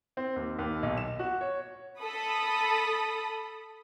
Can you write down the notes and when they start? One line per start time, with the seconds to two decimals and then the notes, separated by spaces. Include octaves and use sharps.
0.17 C4
0.36 D#2
0.59 D#2
0.83 B1
0.97 E7
1.19 F#4
1.41 C#5
2.01 A4 B5 D#6